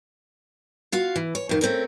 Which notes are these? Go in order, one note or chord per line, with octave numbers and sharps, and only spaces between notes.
F4 F#4 F5
E3
C#5
F2 D#3
A3 C4 C#4 A#4